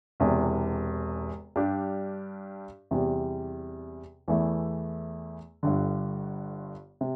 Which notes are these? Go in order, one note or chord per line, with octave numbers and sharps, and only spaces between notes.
E1 E2 C3
G2 G3 D4 G4
E2 C3 G3
E2 E3 A3 E4
G1 G2 D3
C3